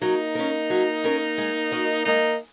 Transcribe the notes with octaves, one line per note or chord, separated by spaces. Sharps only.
F#3 A#3 D#4
C#4 A#4
F#3
C#4 A#4
G#3
F#4 A#4 D#5
G#3 A#3 D#4